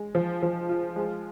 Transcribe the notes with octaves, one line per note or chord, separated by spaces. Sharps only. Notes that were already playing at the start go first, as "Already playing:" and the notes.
Already playing: G#3
F3
F3
F4
G#3